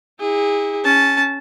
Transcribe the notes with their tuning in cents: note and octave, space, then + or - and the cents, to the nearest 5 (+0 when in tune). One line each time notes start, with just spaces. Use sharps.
E4 -35 G#4 -30
C#4 +0 A5 -10